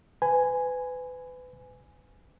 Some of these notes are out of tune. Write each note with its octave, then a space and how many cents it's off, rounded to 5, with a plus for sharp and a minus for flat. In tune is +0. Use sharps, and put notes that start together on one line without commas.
B4 +30 G#5 +0